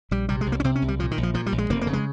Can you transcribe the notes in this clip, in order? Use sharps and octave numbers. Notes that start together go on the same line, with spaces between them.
A#1 G3
C3 G3
G#3
C2
A#3
C#4
C3 C4
C#4
C2
G3
A#2 F3
D#3
A#1
F3
A#2 F3
G3
A#1
G#3
F1 A#3
A#3
C#3
G#3